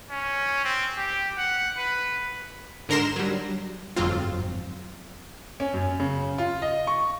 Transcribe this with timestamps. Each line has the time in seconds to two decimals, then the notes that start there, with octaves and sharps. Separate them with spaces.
0.10 C#4
0.64 C4
0.97 G4
1.37 F#5
1.77 B4
2.89 G#2 D3 A#4 A#5 C6 E7
3.16 F#3 G3
3.96 G1 F2 G#2 F#3 C4 F4
5.60 C#4
5.74 F#2
6.00 C#3
6.38 F4
6.62 D#5
6.87 C#6